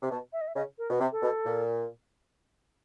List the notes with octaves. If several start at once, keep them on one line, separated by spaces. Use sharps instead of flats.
C3
B2 A5
E5
D#5
E5
C#3 D#5
A#4
B2
C3
A4
B2
A#2